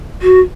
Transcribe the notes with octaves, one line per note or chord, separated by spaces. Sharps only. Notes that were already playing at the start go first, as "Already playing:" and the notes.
F#4